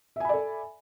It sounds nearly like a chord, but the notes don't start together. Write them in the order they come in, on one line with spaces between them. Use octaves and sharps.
E5 G#5 B5 D5 A4